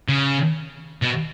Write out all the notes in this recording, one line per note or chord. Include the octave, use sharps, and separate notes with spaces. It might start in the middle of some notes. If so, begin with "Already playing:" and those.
C#3
B2